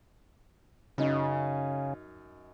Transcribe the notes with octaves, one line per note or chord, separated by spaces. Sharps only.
F#2 C#3 D#4